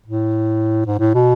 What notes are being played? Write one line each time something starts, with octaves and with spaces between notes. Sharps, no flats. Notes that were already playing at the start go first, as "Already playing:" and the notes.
A2
G#2
A2
B2